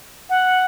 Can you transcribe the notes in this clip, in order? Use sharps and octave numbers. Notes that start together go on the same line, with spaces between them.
F#5